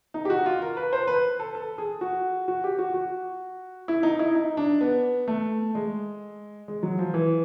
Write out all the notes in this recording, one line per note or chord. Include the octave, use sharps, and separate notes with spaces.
D#4
G4
F#4
F4
A#4
B4
C5
B4
A4
A4
G#4
F#4
F#4
G4
F#4
F#4
E4
D#4
E4
D#4
D4
B3
A3
G#3
G#3
F#3
F3
E3